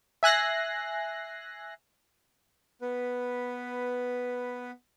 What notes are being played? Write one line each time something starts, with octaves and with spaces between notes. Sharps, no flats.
E5 G#5 F#6 A#6 C7
B3 B4